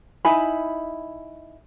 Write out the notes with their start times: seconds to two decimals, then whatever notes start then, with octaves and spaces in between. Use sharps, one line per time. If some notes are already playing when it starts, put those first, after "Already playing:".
0.25 D#4 E4 G#5 B5